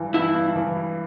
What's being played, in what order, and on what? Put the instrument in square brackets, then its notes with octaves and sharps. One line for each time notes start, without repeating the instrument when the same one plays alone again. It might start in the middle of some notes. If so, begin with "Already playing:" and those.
Already playing: [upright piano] G2 E3
[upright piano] G2 [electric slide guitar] E4
[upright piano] G2
E3
E4